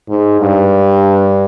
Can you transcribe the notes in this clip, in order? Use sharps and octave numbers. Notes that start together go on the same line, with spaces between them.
G#2
G2